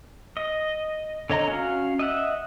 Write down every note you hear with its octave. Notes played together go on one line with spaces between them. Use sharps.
D#5
D3 C#5 D#5 A#5
C#4 F#4 F5
D#5 E5 F#5